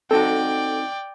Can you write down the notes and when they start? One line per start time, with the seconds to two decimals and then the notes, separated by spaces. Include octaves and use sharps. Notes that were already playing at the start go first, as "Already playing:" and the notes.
0.11 C4 D#4 F#4 A4 D5 G5